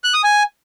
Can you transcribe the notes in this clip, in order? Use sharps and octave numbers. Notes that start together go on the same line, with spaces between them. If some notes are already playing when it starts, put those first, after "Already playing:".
F#6
D#6
G#5